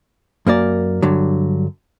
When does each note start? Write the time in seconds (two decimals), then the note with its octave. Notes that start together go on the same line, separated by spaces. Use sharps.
0.47 F#2 A#3 A#4 D5
1.02 G2 D3 F#3